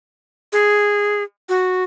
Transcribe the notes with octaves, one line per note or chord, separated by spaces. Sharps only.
G#4
F#4